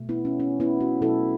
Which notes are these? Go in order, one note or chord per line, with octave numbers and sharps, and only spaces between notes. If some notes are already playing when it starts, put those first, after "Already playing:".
Already playing: B2 A3
B3 E4
C#4
C#4
B3 E4
C#4 F#4
B2 F#3 A3 E4 A4